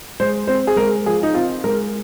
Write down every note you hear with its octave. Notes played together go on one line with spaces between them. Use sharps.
G#3 C5
C4 C5
G#4
G#3 A#4
F3 G#4
D#4
C4 F4
G#3 A#4